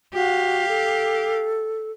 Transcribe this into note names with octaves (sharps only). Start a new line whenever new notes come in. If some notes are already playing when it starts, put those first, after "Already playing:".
F#4 G4 F5
A4